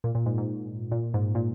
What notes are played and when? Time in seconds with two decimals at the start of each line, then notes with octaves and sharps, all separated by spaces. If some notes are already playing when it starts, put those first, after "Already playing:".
0.04 A#2
0.15 A#2
0.26 G#2
0.38 G#2
0.92 A#2
1.14 G#2
1.35 A#2